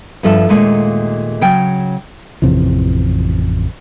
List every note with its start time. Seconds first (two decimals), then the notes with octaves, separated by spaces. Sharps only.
0.23 G2 F3 A4 E5
0.49 D#2 A#2 G#3 A3
1.41 C#3 F#3 G5
2.42 A1 F2 C3 E3